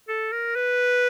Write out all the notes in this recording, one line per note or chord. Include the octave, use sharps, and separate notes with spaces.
A4
A#4
B4